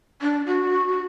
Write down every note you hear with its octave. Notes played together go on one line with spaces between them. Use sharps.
D4
F#4